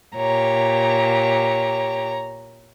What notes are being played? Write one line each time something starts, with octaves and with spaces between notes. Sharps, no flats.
A#2 G4 C#5 A#5